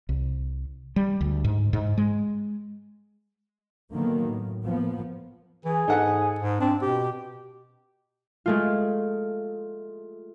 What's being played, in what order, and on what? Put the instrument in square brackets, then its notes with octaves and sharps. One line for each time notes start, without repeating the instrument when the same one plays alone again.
[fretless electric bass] C2
G3
D2
G#2
G#2
G#3
[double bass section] D3 D#3 F#3 A#3 B3
A2
F3 A#3 B3
[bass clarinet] E3 [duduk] G#4
[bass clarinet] G#2 [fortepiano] D#4 A4 F#5
[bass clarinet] G#2
[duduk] C4 [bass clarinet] D4
[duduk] B2 [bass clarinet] G4
[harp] G#3 A3 F4